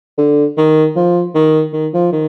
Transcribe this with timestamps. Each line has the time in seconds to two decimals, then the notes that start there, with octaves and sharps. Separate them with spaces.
0.18 D3
0.58 D#3
0.96 F3
1.35 D#3
1.73 D#3
1.94 F3
2.12 D#3